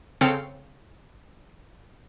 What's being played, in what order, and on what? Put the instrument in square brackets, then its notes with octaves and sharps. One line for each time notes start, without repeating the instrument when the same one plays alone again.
[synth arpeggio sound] C#3 C4 A4 F5 G5 C#7